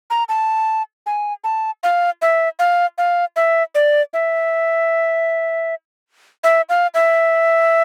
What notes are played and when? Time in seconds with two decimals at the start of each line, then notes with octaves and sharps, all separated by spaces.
0.10 A#5
0.29 A5
1.06 G#5
1.44 A5
1.83 F5
2.22 E5
2.59 F5
2.98 F5
3.36 E5
3.75 D5
4.13 E5
6.44 E5
6.69 F5
6.94 E5